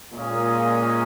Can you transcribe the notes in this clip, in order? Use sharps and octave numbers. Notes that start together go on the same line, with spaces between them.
A#2 G#3 C#4 G#4 D#5